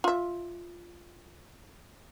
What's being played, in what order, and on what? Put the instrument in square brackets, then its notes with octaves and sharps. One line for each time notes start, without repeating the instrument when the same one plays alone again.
[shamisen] F4 E5